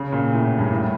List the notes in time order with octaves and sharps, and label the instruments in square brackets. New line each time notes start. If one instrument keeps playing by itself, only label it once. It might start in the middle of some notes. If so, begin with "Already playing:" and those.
Already playing: [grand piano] C#3
A#2
A2
A2
G2
A2